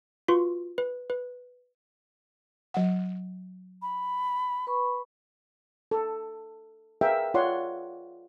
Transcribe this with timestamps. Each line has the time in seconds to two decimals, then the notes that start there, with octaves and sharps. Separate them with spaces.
0.28 F4 F#4 B4 C6 C#6
0.78 B4
1.10 B4
2.74 F#3 F#5
3.82 B5
4.67 B4 B5 C#6
5.91 A4
7.01 G#4 A#4 B4 E5 F5 G5
7.34 F4 C#5 D5 F#5 C6